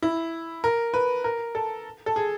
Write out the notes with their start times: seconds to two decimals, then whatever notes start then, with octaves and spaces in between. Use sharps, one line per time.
0.02 E4
0.64 A#4
0.94 B4
1.24 A#4
1.55 A4
2.06 A4
2.16 G#4